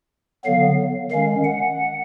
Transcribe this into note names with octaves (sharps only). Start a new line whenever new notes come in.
D3 F#3 B3 F5
D#3 G#3 C#4 F5
F#5